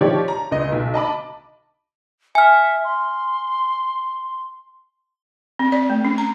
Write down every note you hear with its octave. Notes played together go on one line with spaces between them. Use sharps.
F3 D#4 G4 C#5 D5
A#5
C#2 D#5
B1
D#5 A5 B5 D6
E5 G#5 F6
C6
C4
D5
A3
C#4
A#5